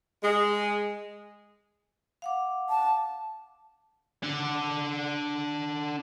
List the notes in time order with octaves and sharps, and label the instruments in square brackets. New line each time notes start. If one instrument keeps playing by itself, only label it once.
[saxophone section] G#3
[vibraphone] F5 F#5 D6
[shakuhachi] A5
[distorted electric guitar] D4 F#5